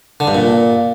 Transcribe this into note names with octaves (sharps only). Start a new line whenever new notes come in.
D3
G2
A#2